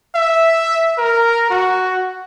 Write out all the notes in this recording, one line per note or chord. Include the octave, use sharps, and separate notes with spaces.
E5
A#4
F#4